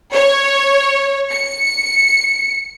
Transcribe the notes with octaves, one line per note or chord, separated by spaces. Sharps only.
C#5
C#7